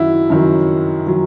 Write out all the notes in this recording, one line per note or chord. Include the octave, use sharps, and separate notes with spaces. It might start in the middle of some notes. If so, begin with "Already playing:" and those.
Already playing: F#2 D#3 F#3 E4 F#4
F#2 D#3 F#3
D#3 F#3